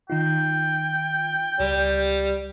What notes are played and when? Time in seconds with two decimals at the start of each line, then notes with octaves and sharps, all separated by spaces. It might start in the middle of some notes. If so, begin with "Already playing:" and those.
0.10 D#3 D#4 F4 G5
1.59 C#2 G3